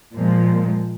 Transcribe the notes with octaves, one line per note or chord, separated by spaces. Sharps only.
A#2 F3 G#3